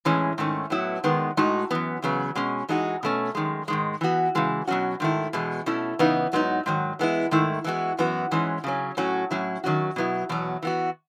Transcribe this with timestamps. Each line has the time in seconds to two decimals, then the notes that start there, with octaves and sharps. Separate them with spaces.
0.05 A2 E3 G#3 C#4
0.38 G#2 D#3 A3 C#4
0.70 A2 F#3 B3 E4
1.04 G#2 D#3 G#3 B3
1.37 A2 G#3 D#4 F#4
1.71 F#2 E3 B3
2.02 E2 C#3 F#3 B3
2.35 B2 G#3 C#4
2.69 E3 G#3 D#4 F#4
3.03 B2 A3 C#4
3.35 F#2 D#3 G#3
3.68 G#2 D#3 G#3
4.01 E3 B3 F#4
4.35 C#3 E3 G#3
4.67 B2 F#3 C#4 F#4
5.00 G#2 D#3 A3 E4
5.33 E2 B2 G#3
5.66 B2 A3 C#4 E4
5.99 C#3 E3 B3 D#4
6.33 G#2 F#3 B3 D#4
6.66 G#2 D#3 F#3
6.99 E3 G#3 B3 E4
7.31 G#2 D#3 A3 E4
7.64 E3 G#3 B3 F#4
7.98 F#2 E3 B3 F#4
8.31 G#2 E3 G#3 C#4
8.64 C#3 F#3 C#4
8.97 A2 F#3 C#4 F#4
9.31 A2 F#3 C#4 E4
9.64 D#3 F#3 C#4 F#4
9.96 B2 F#3 B3 E4
10.29 E2 B2 F#3
10.63 E3 B3 F#4